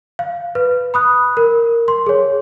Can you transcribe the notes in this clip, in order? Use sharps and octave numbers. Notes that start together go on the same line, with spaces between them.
F5
B4
B5 D#6 F#6
A#4
C6
G#4 C#5